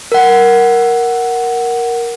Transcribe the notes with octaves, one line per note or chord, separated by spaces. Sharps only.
A#4 F#5